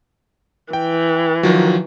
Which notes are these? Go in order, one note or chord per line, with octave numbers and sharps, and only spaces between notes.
E3 G5
D#3 F3 F#3